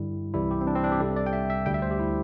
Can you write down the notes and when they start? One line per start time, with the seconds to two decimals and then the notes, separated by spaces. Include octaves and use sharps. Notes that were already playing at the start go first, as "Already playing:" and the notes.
Already playing: G2 D3 G3 E4
0.34 C2 C3 E3 G3 E4
0.51 G4
0.61 C4
0.67 D4
0.75 C4
0.84 D4
0.92 G4
1.00 C2 C3 G3 A4
1.16 D5
1.26 G5
1.33 E5
1.50 E5
1.66 D2 D3 G3 G5
1.74 E5
1.82 C5
1.91 G4
1.99 E4